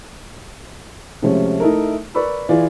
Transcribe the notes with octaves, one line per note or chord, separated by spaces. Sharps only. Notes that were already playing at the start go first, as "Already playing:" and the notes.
C3 F3 G#3 A3 C#4
A3 D#4 E4 A4 A#4
A#4 B4 D5 B5 C#6 E6
E3 F4 G#4 D5 G#5